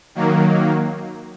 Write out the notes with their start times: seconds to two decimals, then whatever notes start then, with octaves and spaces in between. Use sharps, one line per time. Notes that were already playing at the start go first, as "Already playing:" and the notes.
0.15 D#3 F#3 A#3